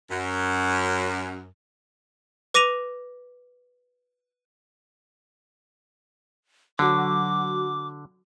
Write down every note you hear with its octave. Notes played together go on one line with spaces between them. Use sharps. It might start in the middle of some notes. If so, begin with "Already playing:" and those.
F#2
B4 D6 A#6 D#7 F7
D3 F#3 F#4 D6